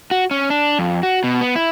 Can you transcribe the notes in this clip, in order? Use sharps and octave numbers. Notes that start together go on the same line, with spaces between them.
F#4
C#4
D4
F2
F#4
B2
B3
E4